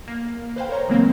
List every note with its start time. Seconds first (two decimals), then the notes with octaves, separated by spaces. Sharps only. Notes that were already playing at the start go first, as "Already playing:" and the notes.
0.08 A#3
0.56 B4 C5 F5 G5
0.69 A#4 C5 C#5 A#5
0.88 C#3 E3 F#3 G#3 A#3 C4